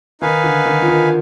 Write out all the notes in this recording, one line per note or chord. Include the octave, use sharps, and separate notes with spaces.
D#3 D#4 B4 F5 G#5
D3
D#3
F3
D#3